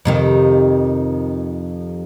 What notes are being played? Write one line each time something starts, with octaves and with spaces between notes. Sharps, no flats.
F2 C3 D#3